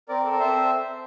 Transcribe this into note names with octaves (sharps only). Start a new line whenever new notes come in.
C4 A#4 D5
A4
D5
C4 C5 E5